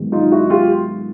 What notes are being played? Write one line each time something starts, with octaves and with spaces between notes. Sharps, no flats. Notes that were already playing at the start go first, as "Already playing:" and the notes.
Already playing: G#2 D#3 F#3 B3
D#4 F4
E4 F#4
F4 G4